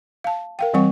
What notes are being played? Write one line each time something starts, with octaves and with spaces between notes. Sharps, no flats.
F5 A5
A#4 F5 G5
E3 G3 C4 F#5 C#6